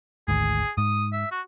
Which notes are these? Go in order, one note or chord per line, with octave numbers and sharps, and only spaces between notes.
G#1 D2 G#2 G#4
G#2 D#6
E5
F#4